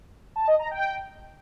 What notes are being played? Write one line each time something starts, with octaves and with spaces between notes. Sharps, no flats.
A5
D#5
A#5
G5